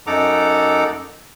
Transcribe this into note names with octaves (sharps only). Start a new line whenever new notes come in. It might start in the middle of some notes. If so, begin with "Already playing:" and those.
F#2 D#4 A4 F#5 A#5 D6